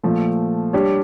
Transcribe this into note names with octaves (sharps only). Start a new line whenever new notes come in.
A#2 F3 A3
G3 D4 G4 C#5